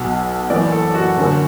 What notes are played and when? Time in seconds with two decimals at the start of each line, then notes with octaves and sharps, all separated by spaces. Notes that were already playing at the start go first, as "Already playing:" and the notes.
Already playing: B1 B2 F#5
0.50 F#1 F#2 E3 D5
0.72 A4
0.95 F#4
1.17 F#1 F#2 D3